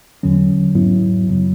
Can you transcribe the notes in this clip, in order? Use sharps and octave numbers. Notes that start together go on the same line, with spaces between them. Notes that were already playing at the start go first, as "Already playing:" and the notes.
E2 D3 F#3 C#4
G#2 F#3 B3 E4
F#2 C#3 F#3